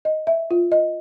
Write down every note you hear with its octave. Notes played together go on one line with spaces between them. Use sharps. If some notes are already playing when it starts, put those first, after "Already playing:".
D#5
E5
F4
D#5